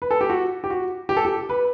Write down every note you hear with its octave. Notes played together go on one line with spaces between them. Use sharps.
B4
A4
G4
F#4
G4
F#4
G4
A4
G4
B4